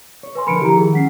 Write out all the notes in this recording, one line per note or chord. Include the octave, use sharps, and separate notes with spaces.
C#5
B4 G#5 C6
D3 F3 A#4 B5 C#7 D7
D#3 F3 E4 G4 A#5
G#4
F#3 C#4 F#5 B6 C7